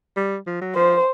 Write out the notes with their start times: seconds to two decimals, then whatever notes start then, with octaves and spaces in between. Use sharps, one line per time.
0.16 G3
0.47 F3
0.61 F#3
0.75 F3 C5